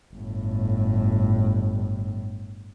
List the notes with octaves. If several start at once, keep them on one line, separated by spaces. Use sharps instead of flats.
G1 A2